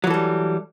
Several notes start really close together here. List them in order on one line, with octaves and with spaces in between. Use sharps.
F#3 E3 A4 G3